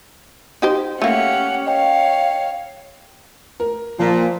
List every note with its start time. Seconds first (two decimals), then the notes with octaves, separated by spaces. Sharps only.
0.62 D#4 G4 C5
1.02 A3 A#3 C#4 G4 F#5
1.66 C#5 D#5 F5 G5
3.60 A#4
3.99 A#2 F3 F4